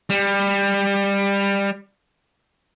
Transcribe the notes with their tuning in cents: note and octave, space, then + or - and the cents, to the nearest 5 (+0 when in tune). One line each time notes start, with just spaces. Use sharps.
G3 +20